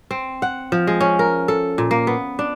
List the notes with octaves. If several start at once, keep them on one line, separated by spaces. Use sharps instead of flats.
C4
F#5
F3
G#3
C#4
A#4
A4
A#2
A#3
B3
D4